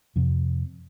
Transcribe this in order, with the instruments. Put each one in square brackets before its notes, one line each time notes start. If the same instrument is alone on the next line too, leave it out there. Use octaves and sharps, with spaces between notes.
[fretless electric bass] F2 C3